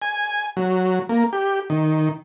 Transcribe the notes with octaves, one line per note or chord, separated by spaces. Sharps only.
G#5
F#3
A#3
G4
D#3